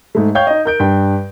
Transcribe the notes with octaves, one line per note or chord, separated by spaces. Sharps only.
G#2 A3
C#5 F5 G5 C#6 G6
D#4 D#5
A#4 G6 D7
G2 G5